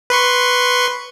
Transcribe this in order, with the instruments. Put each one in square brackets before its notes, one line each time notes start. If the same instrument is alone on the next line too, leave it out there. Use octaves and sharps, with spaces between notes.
[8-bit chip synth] B4 C6 C#6